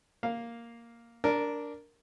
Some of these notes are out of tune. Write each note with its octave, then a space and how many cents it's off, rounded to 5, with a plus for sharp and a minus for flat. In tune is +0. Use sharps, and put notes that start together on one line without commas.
A#3 +0 F5 +0
D4 -10 A#4 +0 D5 +30